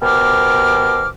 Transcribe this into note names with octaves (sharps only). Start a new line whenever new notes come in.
B2 G4 A#4 C5 D6 F6